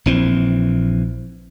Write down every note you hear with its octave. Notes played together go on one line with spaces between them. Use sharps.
A#1 E3 C4